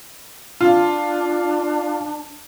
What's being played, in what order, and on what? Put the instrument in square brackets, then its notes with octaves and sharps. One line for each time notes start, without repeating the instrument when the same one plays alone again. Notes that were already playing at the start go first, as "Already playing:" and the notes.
[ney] D4 [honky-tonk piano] F4